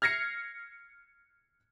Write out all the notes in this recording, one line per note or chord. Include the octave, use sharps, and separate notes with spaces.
F6 G#6 A#6 C7 C#7